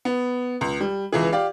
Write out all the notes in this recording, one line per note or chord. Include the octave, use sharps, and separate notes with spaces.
B3
C#2
G3
C#2 E3 G#4
G4 D5 F5